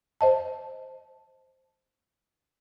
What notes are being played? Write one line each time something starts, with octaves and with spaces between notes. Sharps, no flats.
C5 D#5 A5